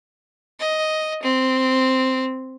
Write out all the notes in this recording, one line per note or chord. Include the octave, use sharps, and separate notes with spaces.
D#5
C4